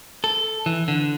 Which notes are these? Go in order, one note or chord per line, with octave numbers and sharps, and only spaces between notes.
A4
E3
D3